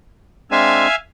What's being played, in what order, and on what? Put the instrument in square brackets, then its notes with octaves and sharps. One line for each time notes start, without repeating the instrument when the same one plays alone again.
[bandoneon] G#3 C4 D4 [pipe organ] E5 F5 G#5